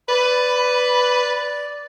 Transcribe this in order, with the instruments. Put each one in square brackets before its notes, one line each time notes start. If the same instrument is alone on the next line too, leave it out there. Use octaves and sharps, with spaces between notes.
[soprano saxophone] B4 [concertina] D5 [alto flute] B5